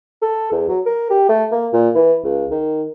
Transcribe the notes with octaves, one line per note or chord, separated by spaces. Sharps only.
A4
E2
F#3
A#4
G4
A3
A#3
A#2
E3
C#2
D#3